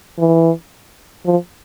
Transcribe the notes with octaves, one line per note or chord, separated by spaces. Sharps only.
E3
F3